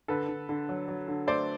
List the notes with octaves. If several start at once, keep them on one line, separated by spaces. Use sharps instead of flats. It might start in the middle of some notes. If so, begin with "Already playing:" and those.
D3 A4 B4
D3
D3
F#3
F#3
D3
A3 C5 D5